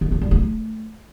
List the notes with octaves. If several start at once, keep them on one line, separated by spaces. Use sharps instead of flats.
D#3
F#3
G3
A3